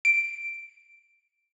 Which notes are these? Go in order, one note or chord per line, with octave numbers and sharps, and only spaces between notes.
D7